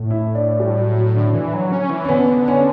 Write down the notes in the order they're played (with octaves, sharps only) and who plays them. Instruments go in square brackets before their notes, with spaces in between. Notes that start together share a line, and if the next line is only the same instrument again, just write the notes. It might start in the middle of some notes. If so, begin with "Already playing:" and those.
Already playing: [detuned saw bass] A2
[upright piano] E4
D4
G3
F#3
F#3
D3
[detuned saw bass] E3
F#3
C#4
E3
[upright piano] C#4
[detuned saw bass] D3 [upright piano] B3
[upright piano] B3
C#4